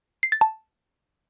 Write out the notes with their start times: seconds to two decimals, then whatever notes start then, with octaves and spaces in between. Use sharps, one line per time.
0.23 C7
0.32 A6
0.41 A5